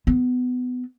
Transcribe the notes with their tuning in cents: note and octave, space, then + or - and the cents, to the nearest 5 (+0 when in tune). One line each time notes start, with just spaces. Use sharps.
B3 +20